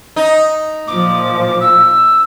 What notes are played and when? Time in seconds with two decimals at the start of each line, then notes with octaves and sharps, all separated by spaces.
0.16 D#4
0.87 A#2 F3 D6
1.60 E6